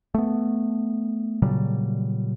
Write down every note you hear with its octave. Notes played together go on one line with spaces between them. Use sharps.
A3 B3
A#2 C#3 F#3 G3